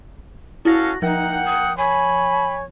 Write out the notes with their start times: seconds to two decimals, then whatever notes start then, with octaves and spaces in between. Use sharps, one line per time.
0.65 C#4 E4 F#4 A4 F5 A#6
1.02 F3 A#3 D#4 F#5 G5
1.46 D#6
1.77 C#5 G#5 B5